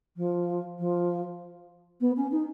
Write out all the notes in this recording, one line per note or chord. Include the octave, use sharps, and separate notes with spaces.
F3
F3
B3
C#4
D#4